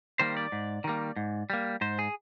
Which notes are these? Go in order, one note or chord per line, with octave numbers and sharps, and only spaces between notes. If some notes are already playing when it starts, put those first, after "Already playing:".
D#3 G3 A#3 C5
D5
G#2
D#3 G3 A#3
G#2
G3 A#3
G#2 C5
G#4